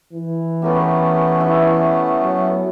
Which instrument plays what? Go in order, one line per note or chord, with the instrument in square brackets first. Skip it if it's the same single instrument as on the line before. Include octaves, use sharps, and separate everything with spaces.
[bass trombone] E3
[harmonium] A3 B3 C#4 [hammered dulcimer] G4 A#4 B4
[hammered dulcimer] E4
[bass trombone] F#3